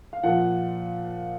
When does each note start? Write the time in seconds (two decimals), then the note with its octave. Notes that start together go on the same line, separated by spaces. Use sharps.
0.13 F5
0.23 A#2 F3 F#5